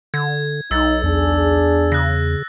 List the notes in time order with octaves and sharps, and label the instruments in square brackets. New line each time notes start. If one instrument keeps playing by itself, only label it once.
[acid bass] D3 [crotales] G#6
[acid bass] B1 [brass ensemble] D#4 [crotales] E6 A6
[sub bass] E2 [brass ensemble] D4 G#4
[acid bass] C#3 [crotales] F#6 A#6